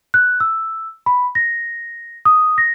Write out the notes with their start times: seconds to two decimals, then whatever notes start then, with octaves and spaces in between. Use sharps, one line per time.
0.14 F#6
0.40 E6
1.06 B5
1.35 A#6
2.25 D#6
2.58 A#6